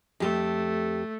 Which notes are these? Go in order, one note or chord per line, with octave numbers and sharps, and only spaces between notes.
F2 A3 G4